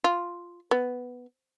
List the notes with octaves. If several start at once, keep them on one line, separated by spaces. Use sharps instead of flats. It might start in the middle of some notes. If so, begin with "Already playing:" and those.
F4
B3